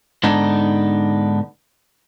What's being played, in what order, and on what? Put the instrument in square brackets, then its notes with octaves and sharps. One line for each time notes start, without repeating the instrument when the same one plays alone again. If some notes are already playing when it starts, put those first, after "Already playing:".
[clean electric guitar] G#2 D3 B3 D4 D#4